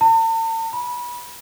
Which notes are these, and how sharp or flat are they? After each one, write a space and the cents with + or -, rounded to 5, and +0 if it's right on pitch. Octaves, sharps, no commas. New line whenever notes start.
A5 +45
B5 -25